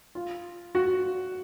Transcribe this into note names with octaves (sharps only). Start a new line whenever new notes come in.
F4
F#4